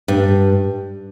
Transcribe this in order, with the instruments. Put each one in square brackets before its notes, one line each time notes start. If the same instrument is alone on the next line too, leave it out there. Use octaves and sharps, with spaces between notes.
[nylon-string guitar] G2